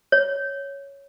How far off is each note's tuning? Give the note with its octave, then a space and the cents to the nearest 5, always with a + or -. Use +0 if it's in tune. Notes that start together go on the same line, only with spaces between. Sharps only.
C#5 +5